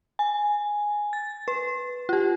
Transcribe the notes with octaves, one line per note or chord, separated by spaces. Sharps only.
G#5
A6
B4
F4 G4